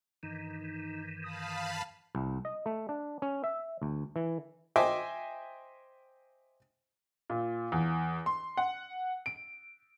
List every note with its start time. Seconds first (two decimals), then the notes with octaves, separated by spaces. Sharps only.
0.23 G2 D#3 E3 D#4
1.24 F5 A5 B5 D#6
2.15 C2
2.45 D#5
2.66 A3
2.89 D4
3.22 C#4
3.44 E5
3.82 D2
4.16 E3
4.76 C5 D#5 E5 G5 G#5 D6
7.30 A#2
7.72 E2
8.26 C6
8.57 F#5
9.26 D7